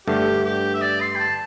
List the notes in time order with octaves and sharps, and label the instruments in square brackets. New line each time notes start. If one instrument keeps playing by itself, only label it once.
[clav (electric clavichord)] G2 D3 A3 [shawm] G4
[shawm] G4
E5
D5
C6
G5
A5